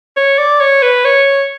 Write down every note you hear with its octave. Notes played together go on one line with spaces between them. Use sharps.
C#5
D5
C#5
B4
C#5